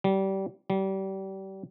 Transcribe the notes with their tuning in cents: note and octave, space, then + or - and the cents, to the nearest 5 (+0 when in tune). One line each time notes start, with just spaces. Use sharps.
G3 -25
G3 -30